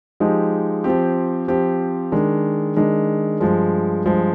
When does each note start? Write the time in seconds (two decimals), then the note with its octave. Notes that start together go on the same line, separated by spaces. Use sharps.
0.20 F3 G#3 D#4 G4
0.84 F3 C4 G4
1.48 F3 C4 G4
2.12 D#3 G#3 D4
2.77 D#3 G#3 D4
3.40 G2 F3 G#3
4.05 G2 F3 G#3